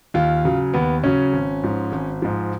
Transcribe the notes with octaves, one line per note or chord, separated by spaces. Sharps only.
D#2 F4
C#3 F#3
D#2 B3
C#3 F#3 C#4
G#1
G#2 F3
G#1
G#2 F3